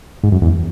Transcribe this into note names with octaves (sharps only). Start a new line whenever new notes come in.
G#2
F#2
E2